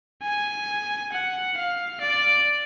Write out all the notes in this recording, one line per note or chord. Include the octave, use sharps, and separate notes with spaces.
G#5
F#5
F5
D5